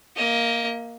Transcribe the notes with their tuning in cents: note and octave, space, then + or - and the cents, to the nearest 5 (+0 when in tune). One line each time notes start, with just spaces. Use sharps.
A#3 +0 D#5 +30